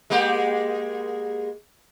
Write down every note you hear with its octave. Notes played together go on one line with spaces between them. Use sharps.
G#3 A#3 G4